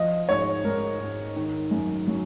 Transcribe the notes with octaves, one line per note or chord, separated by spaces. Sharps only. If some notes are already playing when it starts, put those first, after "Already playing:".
Already playing: F3 D#5
G#2 C#5
G#2 A#4
G#2
D#3
F#2
F#3